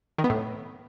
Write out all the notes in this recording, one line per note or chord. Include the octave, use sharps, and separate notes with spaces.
D#3
B3
A2